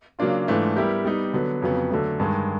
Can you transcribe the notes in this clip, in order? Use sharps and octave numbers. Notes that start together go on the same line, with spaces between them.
C#3 F#3 A#3 D4 F4
G#2 E3 A3 D4 F4
G3 B3 E4 G4 A#4
G3 B3 D#4 G4
D3 F#3 B3
F2 C#3 F#3 B3
D3 F#3 A3
G2 D#3 G#3